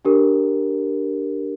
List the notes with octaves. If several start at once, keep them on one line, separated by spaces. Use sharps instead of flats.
D4 G4 A#4